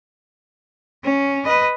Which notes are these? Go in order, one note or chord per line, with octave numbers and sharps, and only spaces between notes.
C#4
B4 D#5